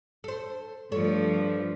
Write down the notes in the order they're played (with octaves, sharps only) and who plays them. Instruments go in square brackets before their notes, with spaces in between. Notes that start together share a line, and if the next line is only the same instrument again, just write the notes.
[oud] A4 C5
[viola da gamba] G2 F3 A3 [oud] A4 C#5